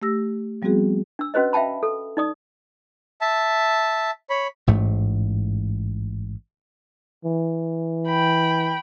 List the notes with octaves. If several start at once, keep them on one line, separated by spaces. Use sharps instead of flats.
A3 G4 E6 A#6
F3 G3 B3 C4 F#4 G#4
D4 E6
C#4 F#4 B4 C5 D#5
E5 F5 G5 A5 B5
A4
D#4 D5 D#6
E5 A5
C#5 B5
A1 G#2 A3
E3
G5 B5